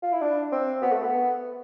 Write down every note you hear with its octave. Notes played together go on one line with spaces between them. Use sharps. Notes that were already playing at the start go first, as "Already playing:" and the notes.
F4
E4
D4
C4
B3
A3
B3